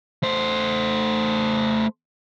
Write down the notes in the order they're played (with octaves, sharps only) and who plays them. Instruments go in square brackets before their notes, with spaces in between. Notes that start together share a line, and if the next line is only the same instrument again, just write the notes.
[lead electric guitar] A3 C5